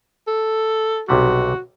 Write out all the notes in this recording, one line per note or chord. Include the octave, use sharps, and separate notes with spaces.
A4
B1 C3 G3 F#4